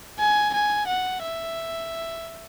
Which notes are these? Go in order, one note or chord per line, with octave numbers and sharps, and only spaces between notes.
G#5
G#5
F#5
E5